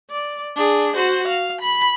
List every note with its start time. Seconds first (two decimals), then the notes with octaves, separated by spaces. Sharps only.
0.11 D5
0.56 D4 G#4
0.96 F#4 C5
1.27 F5
1.61 B5